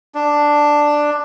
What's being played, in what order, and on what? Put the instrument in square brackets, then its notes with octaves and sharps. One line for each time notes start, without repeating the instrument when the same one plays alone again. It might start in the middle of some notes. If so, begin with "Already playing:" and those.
[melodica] D4